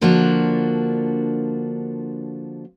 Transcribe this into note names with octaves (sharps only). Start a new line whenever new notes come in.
D3 F3 A#3 D4 F4 F#4